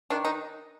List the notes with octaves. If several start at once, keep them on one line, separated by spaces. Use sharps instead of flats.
D#3 D4
D#4